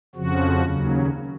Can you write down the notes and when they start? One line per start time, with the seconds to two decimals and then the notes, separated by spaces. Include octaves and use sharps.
0.15 F2 C#3 F3 F#4
0.63 D#2 C#3 F#3